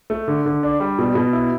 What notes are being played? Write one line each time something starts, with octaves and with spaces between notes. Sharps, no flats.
A3
D3
D3
D4
G3
B2
B2
E4